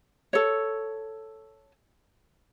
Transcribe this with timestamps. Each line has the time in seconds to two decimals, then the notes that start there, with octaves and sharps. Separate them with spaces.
0.33 A4 C#5